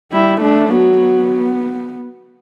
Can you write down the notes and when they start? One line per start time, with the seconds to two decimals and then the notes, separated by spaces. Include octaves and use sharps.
0.12 G3 E4
0.41 A3 D4
0.70 F#3 B3
1.00 B3